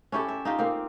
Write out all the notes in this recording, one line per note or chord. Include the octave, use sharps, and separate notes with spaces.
C#4 E4 G4 A4
E5
D#4 F4 G4
A#3 C4